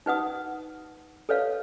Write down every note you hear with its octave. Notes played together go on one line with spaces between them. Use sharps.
D#4 B4 F#5 D#6
A4 B4 C#5 F5